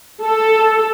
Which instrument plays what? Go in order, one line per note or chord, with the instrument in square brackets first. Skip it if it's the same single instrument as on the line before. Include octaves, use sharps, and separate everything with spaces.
[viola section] A4